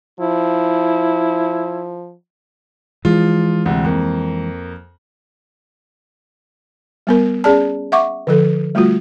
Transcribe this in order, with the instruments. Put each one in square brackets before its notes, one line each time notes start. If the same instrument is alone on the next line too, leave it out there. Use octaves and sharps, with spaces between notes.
[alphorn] F3 [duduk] E4
[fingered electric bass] E3 G#3 [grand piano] F3 F4
[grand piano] D2 C3
F2 A#3
[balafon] G3 B3 A#4
C#4 G#4 D5 A5
E5 F#5 C#6 D6
D3 F3 A4
G3 A3 F4 F#4